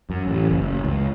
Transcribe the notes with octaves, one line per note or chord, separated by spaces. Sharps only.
F#2
A1
F#1
C#2